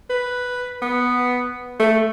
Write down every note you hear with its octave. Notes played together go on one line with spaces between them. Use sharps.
B4
B3
A3